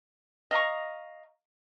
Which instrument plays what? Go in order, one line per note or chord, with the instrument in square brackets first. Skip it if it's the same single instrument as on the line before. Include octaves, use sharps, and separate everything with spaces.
[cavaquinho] D#5 F5 A#5 C#6